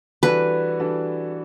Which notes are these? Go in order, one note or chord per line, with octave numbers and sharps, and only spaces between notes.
E3 G3 D4 F#4 A4 B4
E3 G3 D4 F#4 A4